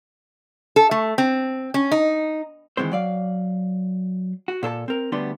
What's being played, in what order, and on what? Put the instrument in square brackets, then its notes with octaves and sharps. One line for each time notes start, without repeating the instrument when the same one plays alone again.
[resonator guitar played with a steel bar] A4
A3
C4
C#4
D#4
[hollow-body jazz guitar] D#3 E3 G#3 C4 C5
F#3 D5 F5
F#4
A#2 A4 C5 A5
C4 A#4
D2 G3 B3 D4 C6